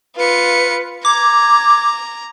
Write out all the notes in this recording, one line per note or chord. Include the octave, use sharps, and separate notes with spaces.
F4 B4 C#7
A#5 D6 G#6